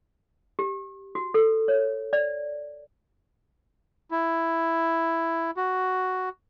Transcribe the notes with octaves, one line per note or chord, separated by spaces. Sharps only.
G4
F#4
A4
C#5
D5
E4
F#4